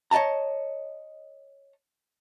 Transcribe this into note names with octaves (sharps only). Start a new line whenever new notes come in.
C#5 D#5 G5 A5 A#5